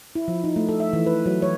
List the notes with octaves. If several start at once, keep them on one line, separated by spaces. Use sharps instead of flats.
E4
F3
D#4
A3
A4
E5
E3
B4
F#3
C#5